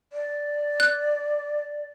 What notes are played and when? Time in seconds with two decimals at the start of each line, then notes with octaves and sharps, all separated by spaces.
0.13 D5
0.80 F#6